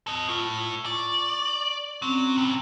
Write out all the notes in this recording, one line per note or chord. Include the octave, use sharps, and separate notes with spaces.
A4 D#5
A2 F4
D5 C#6
F#3 C4 C#4
C3 E3